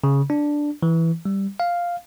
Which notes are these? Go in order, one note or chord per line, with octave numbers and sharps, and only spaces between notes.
C#3
D4
E3
G3
F5